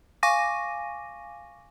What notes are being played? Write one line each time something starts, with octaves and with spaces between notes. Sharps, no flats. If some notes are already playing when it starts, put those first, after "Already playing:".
F5 G#5 C#6 D6 A#6 D#7